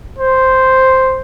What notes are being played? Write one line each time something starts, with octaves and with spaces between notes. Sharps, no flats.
C5